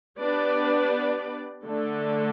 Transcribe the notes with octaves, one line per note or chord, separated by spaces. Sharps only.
B3 D4 G4 B4 D5
D3 A3 D4 A4